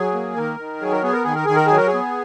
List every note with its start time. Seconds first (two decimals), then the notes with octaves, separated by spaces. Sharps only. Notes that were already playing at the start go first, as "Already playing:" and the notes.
Already playing: F#3 G#4
0.14 A#3
0.36 D#3 A#4
0.59 D#3
0.81 F#3 G#4
0.92 A#4
1.03 B3 G#4
1.13 A#4
1.24 D#3 G#4
1.35 A#4
1.45 D#3 G#4
1.56 A#4
1.66 F#3 G#4
1.77 A#4
1.88 G#4
1.94 B3